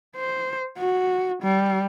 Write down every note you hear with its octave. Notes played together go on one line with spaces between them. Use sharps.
C5
F#4
G3